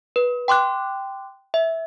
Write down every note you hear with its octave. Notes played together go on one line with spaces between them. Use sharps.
B4
G5 C6 D6 F#6
E5